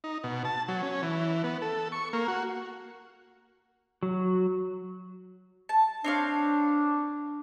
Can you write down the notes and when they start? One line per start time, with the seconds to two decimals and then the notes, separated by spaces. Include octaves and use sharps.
0.04 D#4
0.24 B2
0.45 A5
0.68 F#3
0.83 C#4
1.03 E3
1.44 B3
1.62 A4
1.92 C#6
2.13 A#3
2.28 F#4
4.03 F#3
5.69 A5
6.04 C4 D4 C#5 F5